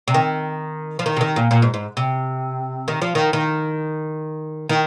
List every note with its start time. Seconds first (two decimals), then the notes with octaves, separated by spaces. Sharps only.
0.08 C3
0.14 D#3
0.99 F3
1.06 D#3
1.17 C3
1.21 D#3
1.36 A#2
1.51 A#2
1.62 G#2
1.74 G#2
1.97 C3
2.88 D#3
3.02 F3
3.15 D#3
3.33 D#3
4.69 D#3